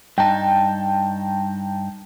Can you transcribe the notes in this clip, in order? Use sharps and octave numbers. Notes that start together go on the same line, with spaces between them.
G2 D#4 G5 A5